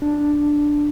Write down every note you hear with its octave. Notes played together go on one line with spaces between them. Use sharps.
D4